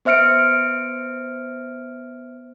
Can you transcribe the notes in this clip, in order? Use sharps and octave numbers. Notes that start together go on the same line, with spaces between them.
B3 C5 E5 F6 C#7 D7